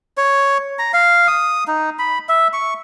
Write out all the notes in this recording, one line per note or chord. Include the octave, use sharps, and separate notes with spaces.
C#5
A#5
F5
D#6
D#4
B5
E5
C#6